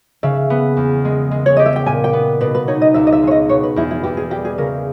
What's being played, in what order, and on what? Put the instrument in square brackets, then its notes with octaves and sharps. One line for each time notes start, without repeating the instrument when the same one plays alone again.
[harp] C#3 [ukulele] E5
[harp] B3
E2
G#3
G#3
[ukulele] C#5
[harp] G4 [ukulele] D#5
[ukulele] E5
G5
[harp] A#2 [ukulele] G#5
[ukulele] G5
[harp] B3
[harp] B2 [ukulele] B4
[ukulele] B4
[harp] D#4 [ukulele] C#5
[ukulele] D#5
[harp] C#2 [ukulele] E5
[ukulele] D#5
E5
[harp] G#3 [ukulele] C#5
[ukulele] D#5
[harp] B2 [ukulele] C#5
[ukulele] B4
[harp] E2 [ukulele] E4
[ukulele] E4
[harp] E2 [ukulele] G4
[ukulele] G#4
[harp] G3 [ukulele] G4
[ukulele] G#4
[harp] C#3 [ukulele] A#4